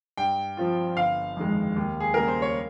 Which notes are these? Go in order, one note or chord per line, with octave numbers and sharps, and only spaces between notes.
G2 G5
F3 C4 F4
G1 F5
F2 D#3 G#3
D#2
G#4
C#3 G3 A#3 A#4
C5
C#5